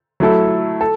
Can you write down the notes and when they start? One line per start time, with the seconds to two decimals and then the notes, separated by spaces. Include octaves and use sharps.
0.20 F#3 A3 E4 A4
0.81 A4